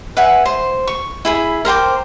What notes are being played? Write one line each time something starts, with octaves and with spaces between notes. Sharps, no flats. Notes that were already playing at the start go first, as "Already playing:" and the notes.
B4 E5 F#5 G#5
C5
C#6
E4 G#4 B5
A#4 C5 G5 D6